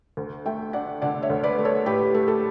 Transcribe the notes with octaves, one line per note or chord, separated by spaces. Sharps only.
D2
A3 E5 G5
D4 D5 F#5
D3 D5 F#5
C#5 E5
D2
B4 D5
A3
A4 C#5
A2 G4 B4
A3
A4